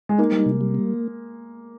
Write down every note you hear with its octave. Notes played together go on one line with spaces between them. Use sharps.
G#3
A#3 D#4
G3
C3
G3
A#3